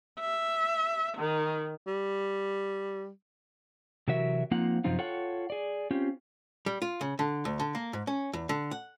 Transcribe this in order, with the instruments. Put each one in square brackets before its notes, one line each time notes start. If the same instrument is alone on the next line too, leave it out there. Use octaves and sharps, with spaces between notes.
[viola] E5
D#3
[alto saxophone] G3
[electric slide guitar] C3 E3 F#3 F#4 A#4 E5
F3 A#3 C4 D#4 F4 F#5
F#2 C3 F3 C4 D#4 F4
F4 A4 C#5 F#5 G5
G#4 D5
C4 C#4 F4 G4
[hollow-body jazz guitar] G3
F4
C#3
D3
D2
D3
A#3
G#2
C#4
E2
D3
F#5